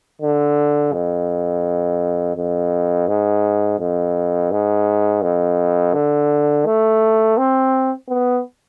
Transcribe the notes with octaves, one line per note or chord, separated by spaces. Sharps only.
D3
F2
F2
G#2
F2
G#2
F2
D3
A3
C4
B3